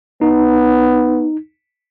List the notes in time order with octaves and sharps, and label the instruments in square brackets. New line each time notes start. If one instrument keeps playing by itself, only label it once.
[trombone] B3 [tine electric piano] D#4